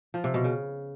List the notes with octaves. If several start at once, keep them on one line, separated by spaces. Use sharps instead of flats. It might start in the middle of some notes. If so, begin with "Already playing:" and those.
F3
C3
B2
C#3